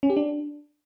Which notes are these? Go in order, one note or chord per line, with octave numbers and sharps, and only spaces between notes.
C#4
G4
D4